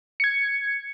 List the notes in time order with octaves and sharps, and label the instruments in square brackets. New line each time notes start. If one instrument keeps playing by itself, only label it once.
[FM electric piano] G#6 C#7